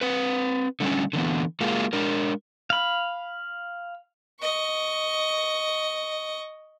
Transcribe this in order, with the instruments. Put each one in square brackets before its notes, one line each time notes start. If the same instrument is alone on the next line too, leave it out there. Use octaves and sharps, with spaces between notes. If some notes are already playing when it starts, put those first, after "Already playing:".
[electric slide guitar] C4 B4
D3 G3 A3 C#4
D3 E3 B3
G#3 A#3 F4 G#4
G#3 D4 A#4
[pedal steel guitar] F5 B5
[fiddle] D#5 C#6